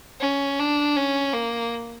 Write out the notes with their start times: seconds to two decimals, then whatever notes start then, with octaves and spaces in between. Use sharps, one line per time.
0.20 C#4
0.59 D4
0.96 C#4
1.33 A#3